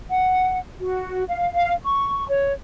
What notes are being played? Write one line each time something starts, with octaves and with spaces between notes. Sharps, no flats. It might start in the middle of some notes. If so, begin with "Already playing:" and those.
F#5
F#4
F5
F5
C#6
C#5